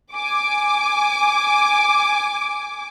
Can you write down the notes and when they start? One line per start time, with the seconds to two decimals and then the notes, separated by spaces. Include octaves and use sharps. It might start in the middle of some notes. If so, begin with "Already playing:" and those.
0.12 G#5 D6